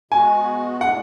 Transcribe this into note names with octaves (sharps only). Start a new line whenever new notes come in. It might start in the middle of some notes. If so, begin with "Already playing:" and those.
B2 G#3 B3 F#4 G#5
A2 G#3 D4 F#5